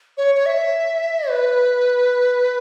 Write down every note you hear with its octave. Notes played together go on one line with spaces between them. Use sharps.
C#5
C#5
E5
B4